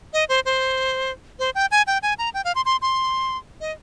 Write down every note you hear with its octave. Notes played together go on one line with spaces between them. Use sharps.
D#5
C5
C5
C5
G5
G#5
G5
G#5
A#5
G5
F5
C6
C6
C6
D#5